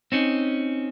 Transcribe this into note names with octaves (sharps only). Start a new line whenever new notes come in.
C4 C#4 D#4